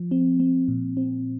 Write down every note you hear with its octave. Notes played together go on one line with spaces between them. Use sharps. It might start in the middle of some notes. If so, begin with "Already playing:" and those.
Already playing: F3
C4
C4
A#2
C4